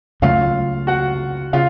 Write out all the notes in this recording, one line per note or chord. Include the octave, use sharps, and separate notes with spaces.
C#2 C#3 F#3 A3 F4 F5
F#4 F#5
C#3 F4 F5